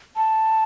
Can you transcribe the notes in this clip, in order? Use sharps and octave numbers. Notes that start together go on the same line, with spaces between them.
A5